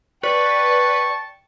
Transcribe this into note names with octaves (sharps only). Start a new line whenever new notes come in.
B4 D5 G5 A5 C#6